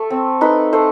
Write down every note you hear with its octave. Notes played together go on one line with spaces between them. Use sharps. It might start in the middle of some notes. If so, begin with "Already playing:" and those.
Already playing: A3
C4
D#4 B4
A3 C5